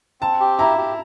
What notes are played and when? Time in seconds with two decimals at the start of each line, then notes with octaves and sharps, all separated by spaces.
0.21 C4 A5
0.40 G4
0.59 E4 A#5
0.78 G4